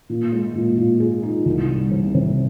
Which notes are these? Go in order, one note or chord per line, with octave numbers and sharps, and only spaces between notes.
A#2
G#3
A#2
A#2
G#4
D#4
C2
G3
C3
C3